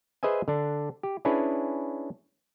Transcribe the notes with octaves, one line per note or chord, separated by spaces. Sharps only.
G#4 B4 C5 D#5 E5 G#5
D3 D4
G4
C#4 D4 E4 G#4 B4 C#5